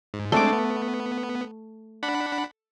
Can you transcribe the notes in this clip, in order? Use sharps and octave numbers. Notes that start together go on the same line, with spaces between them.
G#2
G#3 A3 C4 D4 D6
B3
D4 F#5 B5